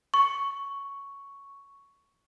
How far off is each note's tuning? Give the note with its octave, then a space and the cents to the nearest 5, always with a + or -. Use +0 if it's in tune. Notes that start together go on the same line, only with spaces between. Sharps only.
C#6 +5